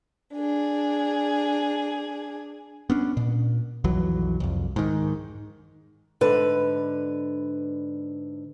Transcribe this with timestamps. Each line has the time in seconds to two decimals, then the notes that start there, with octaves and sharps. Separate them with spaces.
0.35 D4 G#4
2.90 B3 C#4 D4
3.17 A#2
3.84 B1 F2 E3 F#3
4.40 C2 F2
4.76 G#2 D#3
6.21 G#2 D3 B4